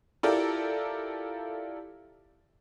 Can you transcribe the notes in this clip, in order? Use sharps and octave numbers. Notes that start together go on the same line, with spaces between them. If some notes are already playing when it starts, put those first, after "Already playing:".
E4 F4 G4 A4 A#4 D5